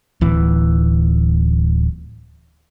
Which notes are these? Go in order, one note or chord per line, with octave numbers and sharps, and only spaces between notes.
D1 E3